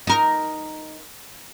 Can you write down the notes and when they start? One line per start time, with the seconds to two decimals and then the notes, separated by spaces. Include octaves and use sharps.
0.07 D#4 A#4